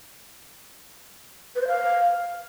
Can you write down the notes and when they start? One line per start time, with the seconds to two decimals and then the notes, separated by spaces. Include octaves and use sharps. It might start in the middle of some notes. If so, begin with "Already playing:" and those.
1.56 B4
1.62 C5
1.68 F5